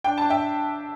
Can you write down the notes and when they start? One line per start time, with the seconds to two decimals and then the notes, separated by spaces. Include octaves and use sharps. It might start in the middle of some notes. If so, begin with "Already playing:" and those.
0.04 D4 G5
0.18 D4 A5
0.30 E5 G5